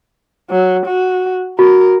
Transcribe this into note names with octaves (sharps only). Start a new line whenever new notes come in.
F#3
F#4
F#4 A#4